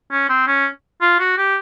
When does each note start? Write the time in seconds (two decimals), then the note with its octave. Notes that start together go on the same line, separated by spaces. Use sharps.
0.11 C#4
0.29 C4
0.48 C#4
1.01 F4
1.19 F#4
1.38 G4